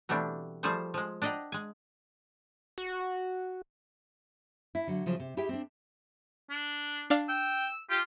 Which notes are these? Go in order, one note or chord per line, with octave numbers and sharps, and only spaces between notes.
B2 E3 G3 A3 C4 D4
F3 G3 A3 G#4 C5
F3 G#3
D4 D5 D#5 F#5 G5 A#5
G#3 G#5
F#4
E4
D3 F#3
C#3 F3 F#3
C3
E4 G4 G#4 E5 G5
C4 D4
D4
D4 D5 F5
G5 E6
F4 G4